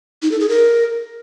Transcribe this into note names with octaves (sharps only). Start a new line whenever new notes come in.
D#4
A4
G#4
A#4